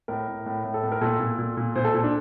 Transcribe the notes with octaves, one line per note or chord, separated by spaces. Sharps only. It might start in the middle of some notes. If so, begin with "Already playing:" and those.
A2 A#4
A2
A2
A2
A4
A2
A#4
A#2 A4
A#2
A#2
A#2
A#2 C5
A4
A#2
D4